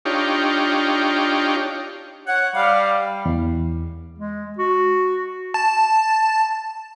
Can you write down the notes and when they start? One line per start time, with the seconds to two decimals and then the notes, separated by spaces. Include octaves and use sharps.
0.05 D4 D#4 F4 G4 C#5
2.27 C#5 F#5
2.56 G3 F5
3.26 E2
4.18 G#3
4.58 F#4
5.54 A5